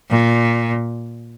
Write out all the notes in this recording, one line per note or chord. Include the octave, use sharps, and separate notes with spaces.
A#2